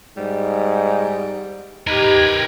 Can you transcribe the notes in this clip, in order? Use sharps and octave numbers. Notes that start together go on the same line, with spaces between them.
G#2 G3
D#4 G4 A#4 B4 G#6